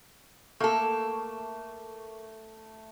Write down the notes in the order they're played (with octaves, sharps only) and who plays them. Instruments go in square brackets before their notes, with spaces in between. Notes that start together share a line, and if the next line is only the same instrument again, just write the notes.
[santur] A3 [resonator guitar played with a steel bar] A#3 A4